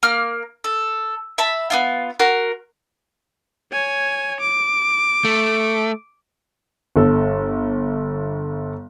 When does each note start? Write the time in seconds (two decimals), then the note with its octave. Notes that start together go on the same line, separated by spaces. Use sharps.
0.03 A#3 F6
0.64 A4
1.38 E5 A5 B5
1.70 B3 D#4 F4
2.19 F#4 A#4 C6
3.72 C#5 G#5
4.40 D6
5.25 A3
6.96 G1 A4